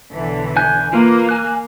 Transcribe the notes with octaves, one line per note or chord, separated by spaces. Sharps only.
B1 D3 E3
G#5 F#6 G6
A#3 F4 A#4 B4
G#5 F#6